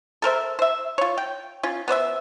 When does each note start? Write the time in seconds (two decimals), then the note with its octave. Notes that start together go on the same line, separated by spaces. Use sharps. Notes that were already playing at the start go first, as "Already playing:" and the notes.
0.22 A4 A#4 C5 E5
0.59 C5 E5
0.98 F4 C#5
1.18 G5
1.63 C#4 F4
1.88 B3 C5 D5 E5